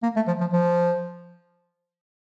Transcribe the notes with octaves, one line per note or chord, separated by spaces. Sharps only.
A#3
A3
F3
F3
F3